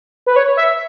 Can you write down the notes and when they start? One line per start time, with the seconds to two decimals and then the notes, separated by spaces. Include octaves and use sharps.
0.27 B4
0.36 C#5
0.57 E5